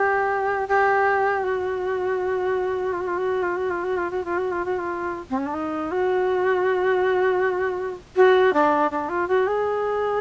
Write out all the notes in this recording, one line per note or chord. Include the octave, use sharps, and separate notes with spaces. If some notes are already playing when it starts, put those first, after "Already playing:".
Already playing: G4
G4
F#4
F4
F#4
F4
F#4
F4
F#4
F4
F#4
F4
F#4
F4
F#4
F4
F#4
F4
C4
C#4
D4
D#4
F#4
F#4
D4
D4
F4
F#4
G#4